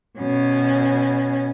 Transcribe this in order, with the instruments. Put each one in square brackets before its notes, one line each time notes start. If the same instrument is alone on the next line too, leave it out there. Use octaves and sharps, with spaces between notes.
[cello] B2 C#4